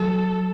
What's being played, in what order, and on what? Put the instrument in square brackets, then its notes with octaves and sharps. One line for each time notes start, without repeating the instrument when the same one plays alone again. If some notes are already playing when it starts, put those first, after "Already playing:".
Already playing: [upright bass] F#3 [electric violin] A4